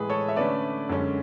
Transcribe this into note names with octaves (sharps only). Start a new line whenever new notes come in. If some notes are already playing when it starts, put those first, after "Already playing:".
Already playing: A2 E3 G#3 G#4 B4
A4 C#5
E5
D3 A3 C#4 B4 D5
F#2 D3 G#3 C#4